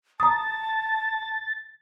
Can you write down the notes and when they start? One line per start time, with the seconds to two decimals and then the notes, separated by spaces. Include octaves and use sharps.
0.20 A5 A#5 D#6 A6